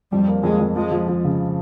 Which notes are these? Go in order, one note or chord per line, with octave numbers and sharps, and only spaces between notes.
F2 G3
A#3
F2 G#3
F2
F3 G#3
F3
F3
C#3